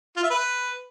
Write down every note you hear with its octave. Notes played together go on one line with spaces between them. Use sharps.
F4
E5
B4